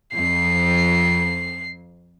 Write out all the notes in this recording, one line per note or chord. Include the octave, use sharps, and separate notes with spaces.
F2 C7